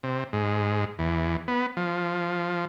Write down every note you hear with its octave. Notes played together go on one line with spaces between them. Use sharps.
C3
G#2
E2
B3
F3